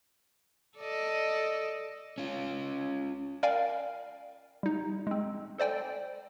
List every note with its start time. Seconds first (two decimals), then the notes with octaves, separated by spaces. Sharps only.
0.77 A4 D5 D#5
2.18 C#4 F4
3.43 A#4 D5 F5 G5 G#5
4.63 G3 D#4
5.07 G#3 C4
5.58 A4 C5 D5 G5 G#5